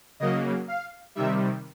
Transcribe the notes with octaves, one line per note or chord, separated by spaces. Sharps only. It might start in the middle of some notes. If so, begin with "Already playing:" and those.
C#3 F#3 A#3 D#5
F5
C3 D#3 G3 E5